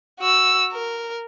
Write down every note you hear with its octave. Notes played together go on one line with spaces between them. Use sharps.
F#4 E6
A#4